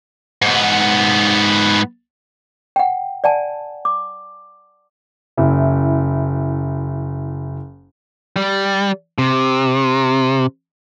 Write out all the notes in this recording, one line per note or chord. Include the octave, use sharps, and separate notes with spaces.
G#2 B3
F#5 G5
D5 F#5 G#5 A5
D6
F#1 E4
G3
C3